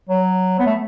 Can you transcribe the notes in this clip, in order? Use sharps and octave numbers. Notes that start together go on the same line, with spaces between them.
F#3
B3
A3